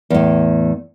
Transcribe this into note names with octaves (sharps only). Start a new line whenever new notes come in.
E2 A2